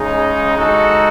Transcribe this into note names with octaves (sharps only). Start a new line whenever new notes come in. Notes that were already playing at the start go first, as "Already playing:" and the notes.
Already playing: C#3 G#3 D#4
G#3 D#4 F#4 A4